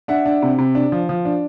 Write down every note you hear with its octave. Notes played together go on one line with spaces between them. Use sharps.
D4 E5 F#5
D4
C3
C3
D4
F3
F3
D4